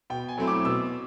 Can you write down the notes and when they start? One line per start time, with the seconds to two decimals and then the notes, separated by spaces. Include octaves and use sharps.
0.10 B2 G5
0.29 G#5
0.38 F#3 A3 C4 E4
0.47 D6
0.65 B2 E6